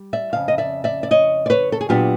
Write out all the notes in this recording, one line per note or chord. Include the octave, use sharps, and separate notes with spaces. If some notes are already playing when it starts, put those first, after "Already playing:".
Already playing: G3
D5 E5
F2 C#3 F5
D#5
D5 E5
D5 E5
D5
C#5 D#5
D5
B4 C#5
A4
G#4
A#2 F#3 B3 D4 F4 G4